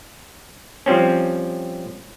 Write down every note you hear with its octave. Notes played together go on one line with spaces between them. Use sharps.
F3 G3 C4 C#4